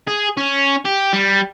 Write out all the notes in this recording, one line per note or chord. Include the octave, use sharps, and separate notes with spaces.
G#4
C#4
G4
G3